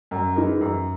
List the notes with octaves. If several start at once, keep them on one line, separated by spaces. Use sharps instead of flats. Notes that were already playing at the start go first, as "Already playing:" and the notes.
F#2
E3 G#3 D#4 A#4
F#2